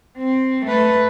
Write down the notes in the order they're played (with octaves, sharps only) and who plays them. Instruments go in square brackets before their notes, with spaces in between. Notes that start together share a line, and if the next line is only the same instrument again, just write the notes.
[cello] C4
A3 B4